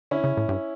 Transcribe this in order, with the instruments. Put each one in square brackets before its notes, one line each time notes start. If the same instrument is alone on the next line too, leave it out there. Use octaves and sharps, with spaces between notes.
[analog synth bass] D3 [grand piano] C#4 E4
[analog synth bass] C#3
A2
G2